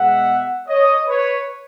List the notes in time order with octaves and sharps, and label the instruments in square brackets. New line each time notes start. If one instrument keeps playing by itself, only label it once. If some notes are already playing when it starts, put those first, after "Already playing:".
Already playing: [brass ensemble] B2 G#3 B3 E5 F#5
C#5 D#5
B4 C#5